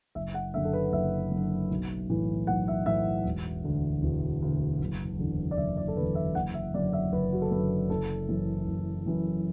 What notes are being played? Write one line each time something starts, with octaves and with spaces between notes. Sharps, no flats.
F#1 E5
F#5
F#2 D3 E5
A4
B4
F#1 E5
F#2 D3
B1
A2 E3
B1 F#5
E5
A2 E3 E5
E1
D2 D3
E1
D2 D3
F#1
E2 D3
D5
F#1 E5
D5
A4
E2 D3 B4
E5
F#1 F#5
E5
F#2 D3 D5
E5
F#1 B4
F#4
A4
F#2 D3 B4
F#1 A4
F#2 E3
F#1
F#2 E3